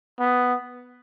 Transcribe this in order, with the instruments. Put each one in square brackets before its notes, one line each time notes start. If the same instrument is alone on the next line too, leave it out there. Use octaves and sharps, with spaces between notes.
[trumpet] B3